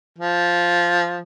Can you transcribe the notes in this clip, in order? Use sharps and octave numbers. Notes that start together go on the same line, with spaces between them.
F3